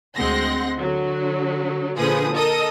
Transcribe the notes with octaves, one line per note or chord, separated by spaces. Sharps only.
D2 G#3 C4 F#5 C6 A#6
D3 F#3
A#2 D3 F3 G#4 B4 D#6
A4 A#4 D#5 D#6